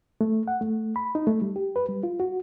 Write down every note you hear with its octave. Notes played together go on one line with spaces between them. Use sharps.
A3
F#5
A3
B5
D#4
A3
G3
G4
B4
G3
F4
F#4